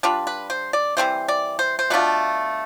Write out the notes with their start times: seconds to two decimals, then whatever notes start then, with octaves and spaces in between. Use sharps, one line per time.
0.03 G3 D4 F4 B4
0.27 B4
0.50 C5
0.73 D5
0.97 E3 G3 C4 E4 C5
1.28 D5
1.59 C5
1.79 C5
1.90 B2 A3 D4 F4 B4